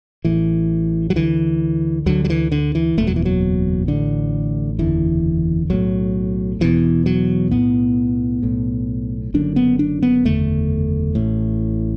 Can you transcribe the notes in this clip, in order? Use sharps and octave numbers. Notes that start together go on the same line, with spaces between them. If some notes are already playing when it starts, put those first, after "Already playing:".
A1 A2 E3
F#3
D2 D3 E3
D2 D3 F#3
F#3
E3
D3
E3
F#1 E2 B2 A3
F#3
E3
F#3
A1 A2 D3
F#1 E2 D3 E3
B1 A2 F#3
E1 E2 B2 E3
F#3
B1 A2 B3
B1 A2
F#1 F#2 D3 D4
B3
D4
B3
F#1 E2 D3 A3
A1 A2